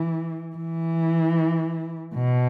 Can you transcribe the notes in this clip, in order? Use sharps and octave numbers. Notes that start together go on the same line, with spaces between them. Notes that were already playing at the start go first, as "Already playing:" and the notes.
Already playing: E3
E3
B2